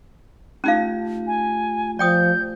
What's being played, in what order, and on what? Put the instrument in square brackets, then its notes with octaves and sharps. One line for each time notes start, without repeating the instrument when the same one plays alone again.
[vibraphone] A3 F4 G4 [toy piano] C#4 D#4 F5
[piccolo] G#5
[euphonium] F3 [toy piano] D5 G5 D#6 [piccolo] G6